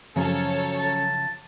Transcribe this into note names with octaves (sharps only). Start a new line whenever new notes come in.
F#2 C#3 F3 C#4 A4 C#5
A5